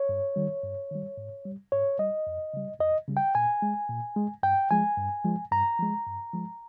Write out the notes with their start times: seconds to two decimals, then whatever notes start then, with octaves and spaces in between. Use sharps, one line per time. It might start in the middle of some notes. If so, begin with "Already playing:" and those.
Already playing: C#5
0.09 G2
0.36 D#3 G3
0.64 G2
0.91 D#3 G3
1.17 G#2
1.45 G3
1.72 G#2 C#5
1.99 G3 D#5
2.27 F2
2.54 C#3 G3
2.80 F2 D#5
3.08 C#3 G3
3.17 G5
3.35 A#2 G#5
3.62 G#3
3.89 A#2
4.16 G#3
4.43 G2 G5
4.71 F3 G#3 G#5
4.98 G2
5.25 F3 G#3
5.52 G2 A#5
5.79 F3 G#3
6.07 G2
6.33 F3 G#3